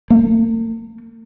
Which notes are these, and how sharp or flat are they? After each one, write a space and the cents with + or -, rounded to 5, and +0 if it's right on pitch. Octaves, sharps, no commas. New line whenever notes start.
A#3 -45